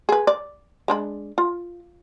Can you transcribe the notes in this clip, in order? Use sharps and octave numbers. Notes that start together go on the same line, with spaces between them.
G#4 B4
D5
G#3 D4 B5
F4